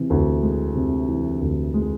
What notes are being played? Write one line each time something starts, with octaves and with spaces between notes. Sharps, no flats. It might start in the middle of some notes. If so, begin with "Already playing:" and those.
Already playing: C3 E3
D2
G#3
C3
E3
D2
G#3